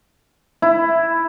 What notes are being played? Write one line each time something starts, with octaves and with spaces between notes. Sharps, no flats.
E4